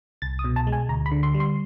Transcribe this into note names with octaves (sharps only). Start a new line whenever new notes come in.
C2 A6
D#6
B2
A5
G#3
G#5
D2 A#5
B5
D3
C6
G3
C6